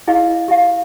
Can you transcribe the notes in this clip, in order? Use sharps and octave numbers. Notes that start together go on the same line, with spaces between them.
E4 G#4 D#5 F5
G4 E5 F5